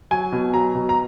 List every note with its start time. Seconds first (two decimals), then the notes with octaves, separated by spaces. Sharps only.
0.11 F#3 G#5
0.32 B2
0.54 F#3 A#5
0.75 B2
0.89 A#5